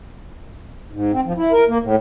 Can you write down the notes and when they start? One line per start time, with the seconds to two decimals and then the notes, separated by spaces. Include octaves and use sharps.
0.91 G#2
1.13 C4
1.25 F3
1.37 E4
1.52 A#4
1.69 A#3
1.83 A2